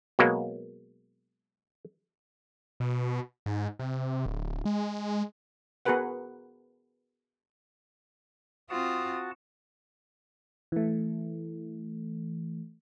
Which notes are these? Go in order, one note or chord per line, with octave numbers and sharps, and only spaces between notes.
B2 F#3 G#3 A#3
B2
G#2
C3
D1
G#3
B3 F#4 G#4 A#4 B4 F#5
C4 F4 F#4 F#5 A5 D#6
E3 A3